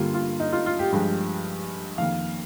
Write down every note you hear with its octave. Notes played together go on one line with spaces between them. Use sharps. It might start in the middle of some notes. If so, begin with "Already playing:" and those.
Already playing: G2 D3 G3 A#3 F4
F4
D#4
F4
F4
G4
G2 F3 G#3
F2 D#3 A#3 F5